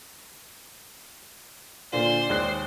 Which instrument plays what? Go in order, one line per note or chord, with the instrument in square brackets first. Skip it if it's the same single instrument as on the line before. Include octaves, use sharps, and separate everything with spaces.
[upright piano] A#2 D3 F4 [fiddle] C5 [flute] D5
[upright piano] D#2 G#3 F#6